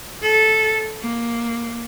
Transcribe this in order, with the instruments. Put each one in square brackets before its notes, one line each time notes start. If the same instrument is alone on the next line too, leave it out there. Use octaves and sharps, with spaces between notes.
[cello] A4
A#3